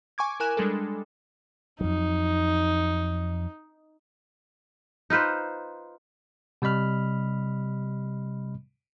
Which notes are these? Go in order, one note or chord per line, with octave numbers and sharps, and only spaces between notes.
G#5 C#6 D6 G#6
E4 A#4 G#5 F#6 E7
G3 G#3 D4 A4
F2 F#3 D#4
D#4 F4 B4 C5
C3 G3 D#5 B5 F6